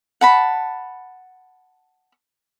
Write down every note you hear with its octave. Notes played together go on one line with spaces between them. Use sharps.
F#5 A5 B5